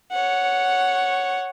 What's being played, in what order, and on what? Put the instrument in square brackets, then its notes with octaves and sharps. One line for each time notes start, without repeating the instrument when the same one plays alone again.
[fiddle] C#5 F#5